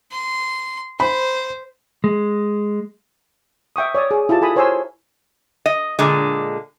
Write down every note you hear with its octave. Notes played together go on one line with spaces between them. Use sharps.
C6
C5 B5
G#3
E5 G5 C#6 D#6
C#5 D5 D#6 E6
G#4
E4 F4 G4 A5
A4 G#5 B5 D#6
A#4 C5 C#5 G#5 C6 E6
D#5
A#2 D3 G#3